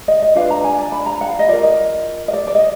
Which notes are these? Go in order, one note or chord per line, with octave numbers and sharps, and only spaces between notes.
D#5
D#5
D4 F4 B4 F5
A#5
G#5
D5
B5
A#5
F#5
F5
D#5
F4 A#4 D5
D#5
D#5
D5
D5
D#5